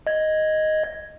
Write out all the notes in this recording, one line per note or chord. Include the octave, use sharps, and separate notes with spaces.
D#5 G#6